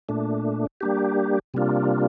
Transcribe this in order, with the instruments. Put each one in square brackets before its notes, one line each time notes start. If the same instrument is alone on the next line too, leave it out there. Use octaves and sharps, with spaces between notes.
[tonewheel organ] A#2 A3 D4
G3 A#3 D4 G4
C3 G3 A#3 D4 F4